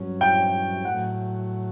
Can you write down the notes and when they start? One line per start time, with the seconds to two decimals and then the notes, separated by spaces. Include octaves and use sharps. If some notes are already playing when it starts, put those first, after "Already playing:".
Already playing: G2 F#3 C#4
0.21 G5
0.85 A2 F#3 A3 F#5